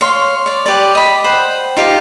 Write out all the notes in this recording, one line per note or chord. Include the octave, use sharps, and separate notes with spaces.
C#5 F5 C6
C#5 D5
G4 B4 D5
D#5 B5
C5 F#5 G5
D#4 F4 G4 F5